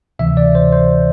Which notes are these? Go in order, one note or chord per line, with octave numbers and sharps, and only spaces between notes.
D2 C3 E3 E5
D5
C5
C5